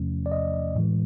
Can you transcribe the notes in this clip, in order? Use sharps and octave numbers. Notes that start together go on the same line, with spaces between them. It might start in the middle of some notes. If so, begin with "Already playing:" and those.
Already playing: E2 C3 F3 A3 C#4
D5
D#5
A2 E3 G#3